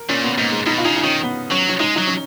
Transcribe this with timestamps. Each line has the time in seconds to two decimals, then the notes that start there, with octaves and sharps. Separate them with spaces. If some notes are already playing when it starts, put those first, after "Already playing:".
Already playing: A#4
0.09 A#2 C#4
0.24 B3
0.38 G#2 A#3
0.52 G#3
0.66 B2 D#4
0.78 F4
0.85 C#3 D#4
0.96 D#4
1.04 D#3 C#4
1.23 B3
1.51 F#3 C#4
1.69 C#4
1.80 G#3 D#4
1.96 F#3 D#4
2.07 C#4